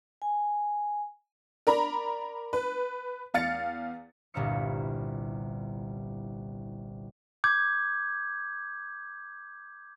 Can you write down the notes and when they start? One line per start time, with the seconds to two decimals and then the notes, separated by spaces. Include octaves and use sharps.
0.22 G#5
1.67 A#4 D5 A#5 B5
2.53 B4
3.34 E2 F5 A6 C#7
4.34 G1 C2 A#2 E4 F6 C#7
7.44 D6 G6 G#6